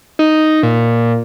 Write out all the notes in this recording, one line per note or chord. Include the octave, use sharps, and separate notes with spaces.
D#4
A#2